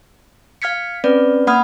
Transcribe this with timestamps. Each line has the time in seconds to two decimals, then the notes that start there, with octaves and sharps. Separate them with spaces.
0.62 F5 F6 G#6 B6 C#7
1.04 C4 C#4 B4 D5
1.47 A#3 F#5 B5 D#6 F6 G#6